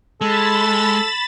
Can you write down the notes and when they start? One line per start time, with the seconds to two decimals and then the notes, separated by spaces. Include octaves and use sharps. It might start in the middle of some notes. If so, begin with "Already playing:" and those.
0.21 G#3 A4 B5 A6 E7